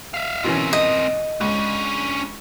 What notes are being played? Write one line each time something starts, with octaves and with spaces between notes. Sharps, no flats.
E5 F5
B2 E3 C4 C#4 A#4
D#5
C#2 C#4 D4